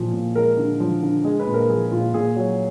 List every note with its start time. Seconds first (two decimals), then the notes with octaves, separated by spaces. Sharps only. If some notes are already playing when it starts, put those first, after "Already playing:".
Already playing: A#2 F3
0.13 A#2
0.35 G#3 A#4
0.57 D3
0.80 F3
1.02 D3
1.25 G#3
1.40 B4
1.47 A#2
1.54 A#4
1.69 F3 G#4
1.92 A#2 F4
2.14 A#2 G#4
2.36 F#3